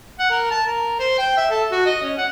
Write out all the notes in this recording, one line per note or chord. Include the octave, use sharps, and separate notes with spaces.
F#5
A#4
A5
A#4
C5
G5
E5
A4
F#4
D#5
C#4
F#5